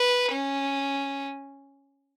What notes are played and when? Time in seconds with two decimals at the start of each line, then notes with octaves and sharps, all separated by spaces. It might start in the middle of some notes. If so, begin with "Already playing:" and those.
Already playing: B4
0.32 C#4